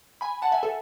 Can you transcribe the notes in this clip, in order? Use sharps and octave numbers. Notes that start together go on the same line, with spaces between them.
G#5 B5
F#5 A5
E5 G#5
A4